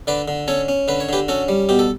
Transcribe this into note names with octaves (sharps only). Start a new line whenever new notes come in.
D3 B4 D5
D3
C#4 A4 C#5
C#4
D3 B4
C#5
D3 G4 B4
C#4 F#4 A4
G3
B2 G4
A4